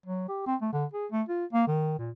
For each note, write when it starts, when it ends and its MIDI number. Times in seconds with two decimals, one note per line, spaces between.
0.06 0.25 54
0.28 0.43 67
0.47 0.56 60
0.62 0.70 57
0.73 0.85 50
0.93 1.06 68
1.12 1.23 57
1.29 1.45 65
1.53 1.67 58
1.68 1.98 51
1.99 2.11 46